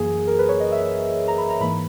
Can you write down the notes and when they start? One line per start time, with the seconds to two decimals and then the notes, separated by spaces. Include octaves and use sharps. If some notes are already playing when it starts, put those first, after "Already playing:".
Already playing: F#2 E3 A#3 G#4
0.27 A#4
0.39 B4
0.49 C#5
0.60 D#5
0.72 E5
1.28 A#5
1.38 B5
1.50 A#5
1.60 G#2 E3 A#3 B5